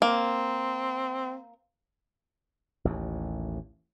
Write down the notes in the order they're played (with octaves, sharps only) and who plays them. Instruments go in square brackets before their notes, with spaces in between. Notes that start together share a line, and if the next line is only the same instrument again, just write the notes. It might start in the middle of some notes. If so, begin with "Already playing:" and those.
[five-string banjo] A#3 [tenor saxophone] C4
[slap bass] A1 D#2